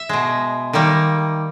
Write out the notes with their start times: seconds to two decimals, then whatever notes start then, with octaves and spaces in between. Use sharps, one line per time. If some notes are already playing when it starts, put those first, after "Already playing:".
Already playing: E5
0.09 B2 G#3
0.73 D#3 G3 A#3